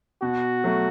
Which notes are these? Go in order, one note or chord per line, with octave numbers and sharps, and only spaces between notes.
B2 F#4
F#3 A3